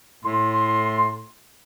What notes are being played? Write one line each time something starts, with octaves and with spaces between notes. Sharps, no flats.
A2 C6